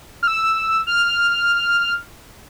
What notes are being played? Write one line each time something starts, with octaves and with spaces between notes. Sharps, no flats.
F6
E6
F6